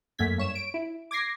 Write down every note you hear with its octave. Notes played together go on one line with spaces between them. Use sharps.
F#2 A3 A#3 G#6 B6
G2 C#5 E7
D7
E4
D6 G#6 A#6 C7